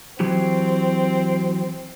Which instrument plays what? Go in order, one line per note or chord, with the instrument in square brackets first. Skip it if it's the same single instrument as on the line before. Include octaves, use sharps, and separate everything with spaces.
[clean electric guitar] E3 F#3 G4 [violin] C4